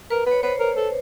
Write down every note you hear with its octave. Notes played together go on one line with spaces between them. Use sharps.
A#4 B4
B4
C#5
B4 C5
A#4
A4